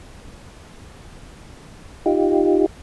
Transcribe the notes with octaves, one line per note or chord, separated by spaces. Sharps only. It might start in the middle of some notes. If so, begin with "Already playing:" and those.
D#4 F4 G4